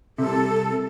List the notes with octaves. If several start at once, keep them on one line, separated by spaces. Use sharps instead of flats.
C2 C3 A4